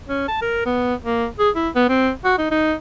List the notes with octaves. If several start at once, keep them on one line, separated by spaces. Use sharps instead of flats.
C#4
A5
A#4
B3
A#3
G#4
E4
B3
C4
F#4
D#4
D#4